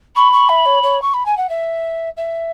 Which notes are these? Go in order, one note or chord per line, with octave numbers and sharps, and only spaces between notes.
B5 C#6
C#6
E5
C#5
C#5
C#6
B5
G#5
F#5
E5
E5